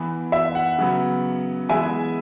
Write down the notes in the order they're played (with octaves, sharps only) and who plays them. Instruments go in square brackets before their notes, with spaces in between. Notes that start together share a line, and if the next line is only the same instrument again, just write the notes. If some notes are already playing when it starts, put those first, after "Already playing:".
Already playing: [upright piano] E3 B3
E5
F#5
C#3 F#3 B3
E3 G#3 B3 E5 G#5